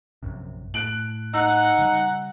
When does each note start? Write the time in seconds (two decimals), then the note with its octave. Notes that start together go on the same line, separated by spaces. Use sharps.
0.23 A#1 F#2 C3
0.74 A2 F#6 D7 F#7
1.34 D#4 F#5 E6 F#6
1.79 C#3 G3